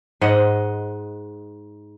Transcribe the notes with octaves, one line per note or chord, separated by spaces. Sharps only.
G#2 G#3 D#5 F#5